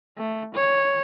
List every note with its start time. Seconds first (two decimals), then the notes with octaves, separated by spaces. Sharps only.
0.18 A3
0.54 C#5